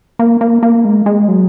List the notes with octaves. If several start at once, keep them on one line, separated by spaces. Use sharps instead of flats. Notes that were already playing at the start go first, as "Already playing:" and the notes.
A#3
A#3
A#3
G#3
G#3
F#3